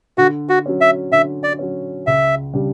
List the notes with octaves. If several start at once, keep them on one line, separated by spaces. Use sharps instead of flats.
D3 F#4
F#4
F#3 C#4
E5
D3 E5
D5
F#3 C#4
C#2 E5
C#3 G3 D4 G4